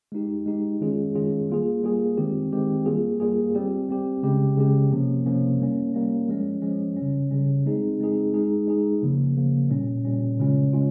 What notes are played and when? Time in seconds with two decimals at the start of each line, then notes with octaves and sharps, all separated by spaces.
0.12 G#3 D#4 G4
0.46 G#3 D#4 G4
0.81 D#3 G#3 C#4 F4 G#4
1.15 D#3 G#3 C#4 F4 G#4
1.50 G3 A#3 F4 G#4
1.84 G3 A#3 F4 G#4
2.18 D#3 G#3 C4 G4
2.52 D#3 G#3 C4 G4
2.86 G3 A#3 F4 G#4
3.20 G3 A#3 F4 G#4
3.55 G3 C4 G4
3.89 G3 C4 G4
4.23 C#3 G#3 C#4 G4
4.57 C#3 G#3 C#4 G4
4.91 C3 F3 A#3 C#4
5.26 C3 F3 A#3 C#4
5.59 G3 A#3 C#4
5.94 G3 A#3 C#4
6.29 F3 G#3 C#4
6.62 F3 G#3 C#4
6.97 C#3 G3 C#4
7.31 C#3 G3 C#4
7.65 G#3 C4 D#4 G#4
8.00 G#3 C4 D#4 G#4
8.34 G#3 D#4 G#4
8.67 G#3 D#4 G#4
9.02 C#3 F3 A#3
9.37 C#3 F3 A#3
9.70 A#2 G3 C#4
10.05 A#2 G3 C#4
10.39 C#3 G#3 C#4 F4
10.73 G#3 C#4 F4